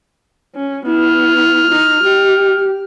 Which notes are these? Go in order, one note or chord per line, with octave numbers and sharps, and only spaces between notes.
C#4
B3 E4 F6
D#4
G4